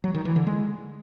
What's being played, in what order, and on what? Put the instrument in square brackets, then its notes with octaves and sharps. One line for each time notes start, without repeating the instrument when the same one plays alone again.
[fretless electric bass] F#3
D#3
E3
D3
G#3